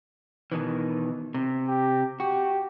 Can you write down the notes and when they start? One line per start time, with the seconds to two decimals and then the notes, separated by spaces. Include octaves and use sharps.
0.52 B2 D#3 E3
1.34 C3
1.68 G4
2.20 F#4 G4